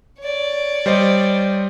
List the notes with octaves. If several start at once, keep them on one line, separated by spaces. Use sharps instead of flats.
C#5 D5
G3 C5 D#5